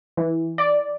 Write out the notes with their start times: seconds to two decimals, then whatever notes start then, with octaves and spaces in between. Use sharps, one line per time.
0.17 E3
0.58 D5